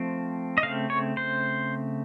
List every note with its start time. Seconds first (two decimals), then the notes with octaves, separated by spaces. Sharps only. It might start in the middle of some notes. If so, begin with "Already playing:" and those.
Already playing: F3 A3 C4
0.58 D#5
0.63 C#3 A3 C4 F5
0.90 C#5
1.17 C5